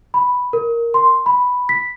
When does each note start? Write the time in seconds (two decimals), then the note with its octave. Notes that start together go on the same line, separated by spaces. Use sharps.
0.14 B5
0.53 A#4
0.94 C6
1.26 B5
1.69 B6